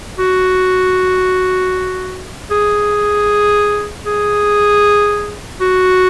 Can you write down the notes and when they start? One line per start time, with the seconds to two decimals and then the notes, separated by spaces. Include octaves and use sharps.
0.18 F#4
2.50 G#4
4.05 G#4
5.61 F#4